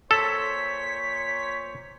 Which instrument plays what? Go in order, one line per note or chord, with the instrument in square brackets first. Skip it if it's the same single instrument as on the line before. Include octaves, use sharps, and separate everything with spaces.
[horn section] A#2 C5 C#5 [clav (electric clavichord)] A4 [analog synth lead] B6